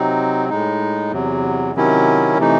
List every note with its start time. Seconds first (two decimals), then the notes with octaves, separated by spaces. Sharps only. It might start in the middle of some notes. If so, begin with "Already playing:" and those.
Already playing: C3 F#3 C4 D#4
0.49 A2 G#3 D#4
1.12 E2 C3 F#3
1.75 C3 D#3 F#3 C#4 E4
2.37 C3 E3 A3 D#4